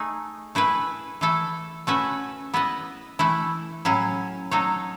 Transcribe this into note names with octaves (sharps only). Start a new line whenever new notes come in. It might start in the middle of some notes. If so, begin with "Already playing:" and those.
Already playing: A3 D#4 G#4
A3 E4 G#4 B4
E3 A3 E4 A4
A3 C#4 F#4 B4 E5
B3 E4 B4 D#5
E3 A3 E4
A2 F#3 C#4 E4
F#3 A3 D#4 A4 C#5